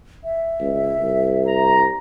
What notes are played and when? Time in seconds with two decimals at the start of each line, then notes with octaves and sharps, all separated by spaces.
0.24 E5
0.60 C#2
1.01 C2
1.48 A#5